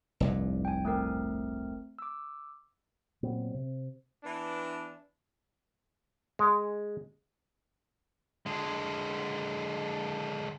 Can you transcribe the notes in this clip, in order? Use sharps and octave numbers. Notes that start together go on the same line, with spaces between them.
F1 C2 G2
G5 G#5
A3 C4 A#4
D6 E6
A#2 F#3 B3 C4
C3
E3 B3 D4
G#3
D3 G#3